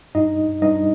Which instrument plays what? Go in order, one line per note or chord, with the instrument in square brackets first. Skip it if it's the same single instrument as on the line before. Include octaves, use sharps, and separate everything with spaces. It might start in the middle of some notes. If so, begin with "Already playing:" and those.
[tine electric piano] G2 D#4 D#5
G2 D#4 D#5